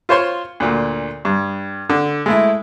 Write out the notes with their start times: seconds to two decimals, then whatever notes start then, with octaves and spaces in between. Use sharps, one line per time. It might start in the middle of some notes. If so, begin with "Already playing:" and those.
0.09 F4 C5 C#5 C6
0.60 D2 A#2
1.25 G2
1.90 D3
2.26 G#3 A3 E4